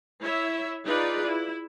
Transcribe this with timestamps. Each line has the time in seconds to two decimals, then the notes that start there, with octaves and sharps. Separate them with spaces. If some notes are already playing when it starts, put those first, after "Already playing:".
0.21 E4 C#5 E5
0.84 D#4 F4 G#4 B4 D5
1.26 E4